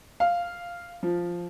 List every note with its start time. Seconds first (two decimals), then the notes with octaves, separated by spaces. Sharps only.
0.20 F5
1.03 F3